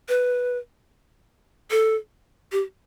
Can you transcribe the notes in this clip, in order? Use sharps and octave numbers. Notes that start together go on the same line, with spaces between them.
B4
A4
G4